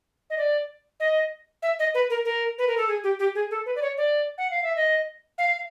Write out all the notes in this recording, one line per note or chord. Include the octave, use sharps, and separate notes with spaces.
D#5
D5
D#5
E5
D#5
B4
A#4
A#4
B4
A#4
A4
G#4
G4
G4
G#4
A4
B4
D5
C#5
D5
F#5
F5
E5
D#5
F5